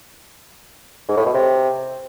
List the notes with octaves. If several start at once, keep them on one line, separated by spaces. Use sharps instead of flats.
G#2
A2
B2
C3